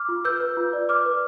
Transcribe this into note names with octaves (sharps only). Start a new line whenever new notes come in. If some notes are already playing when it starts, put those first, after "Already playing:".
Already playing: D6 F6
F4
B4 E6 G6
B4
F4
D5
D5 D6 F6
B4